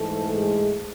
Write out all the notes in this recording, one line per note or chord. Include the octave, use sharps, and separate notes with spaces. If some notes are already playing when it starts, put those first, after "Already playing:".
Already playing: G#2 E3 A3 A4
G#3 G#4